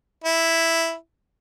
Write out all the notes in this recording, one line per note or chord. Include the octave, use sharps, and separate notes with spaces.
E4